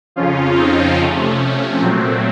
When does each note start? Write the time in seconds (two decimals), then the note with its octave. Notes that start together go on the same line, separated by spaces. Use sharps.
0.16 F2 C#3 F3 C#4 F4
0.57 C4 D#4
0.99 C3 F3 A3 C#4
1.81 A#2 F#3 A3 C4